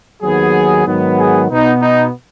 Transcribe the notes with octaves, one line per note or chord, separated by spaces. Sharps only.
D#2 D#3 F#3 B3 G#4
G#2 D#3 F#3 B3
G#4
B2 B3 D#4
D#4